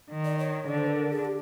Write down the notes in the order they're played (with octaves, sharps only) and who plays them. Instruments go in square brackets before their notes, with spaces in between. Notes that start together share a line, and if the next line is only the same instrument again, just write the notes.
[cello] D#3
[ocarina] D5
C#5
[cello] D3 [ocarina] D5
[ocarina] C5
B4
A#4
G#4
G4